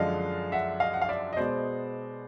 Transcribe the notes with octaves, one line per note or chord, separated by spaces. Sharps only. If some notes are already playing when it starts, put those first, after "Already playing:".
Already playing: F#2 D3 F3 G#3 D#5 F5
E5 F#5
D#5 F5
F#5
F5
D5 E5
D#5
B2 G#3 B3 C5 D5